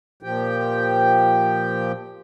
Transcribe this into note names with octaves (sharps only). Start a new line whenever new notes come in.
A#2 F3 G4 G5